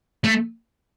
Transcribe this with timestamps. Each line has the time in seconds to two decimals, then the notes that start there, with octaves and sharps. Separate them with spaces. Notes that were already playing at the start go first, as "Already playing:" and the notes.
0.24 A3